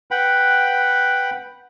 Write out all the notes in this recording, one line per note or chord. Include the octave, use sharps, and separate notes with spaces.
B4 F#5 G5 B5